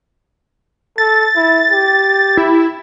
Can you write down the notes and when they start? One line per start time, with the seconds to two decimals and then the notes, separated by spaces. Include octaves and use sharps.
0.98 A4 A6
1.36 E4
1.71 G4
2.37 E4